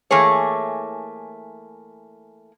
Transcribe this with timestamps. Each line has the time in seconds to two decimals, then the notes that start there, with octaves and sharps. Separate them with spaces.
0.11 E3 A3 A#3 G#4 C#5